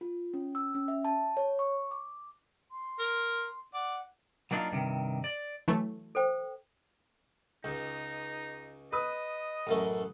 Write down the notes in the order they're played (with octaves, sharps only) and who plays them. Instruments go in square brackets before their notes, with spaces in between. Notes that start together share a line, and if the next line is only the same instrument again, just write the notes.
[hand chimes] F4
C#4
E6
C#4
E5
A5
C#5
C#6
D6
[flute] C6
[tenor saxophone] A#4
[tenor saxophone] D5 [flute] F#5
[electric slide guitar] F#3 A#3 D4 D#4 F4
G2 C3 D#3
D5
[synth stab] E3 F#3 A3
[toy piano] A4 C5 G5
[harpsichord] C#2 [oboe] D#4
[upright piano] B4 D#6 [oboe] D#5
[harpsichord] A1 F#2 A3